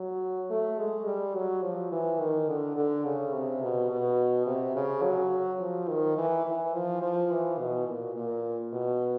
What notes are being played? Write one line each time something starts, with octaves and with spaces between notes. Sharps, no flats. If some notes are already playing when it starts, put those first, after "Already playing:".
Already playing: F#3
A3
G#3
G3
F#3
F3
E3
D#3
D3
D3
C#3
C3
B2
B2
C3
C#3
F#3
F3
D#3
E3
E3
F3
F3
E3
B2
A#2
A#2
B2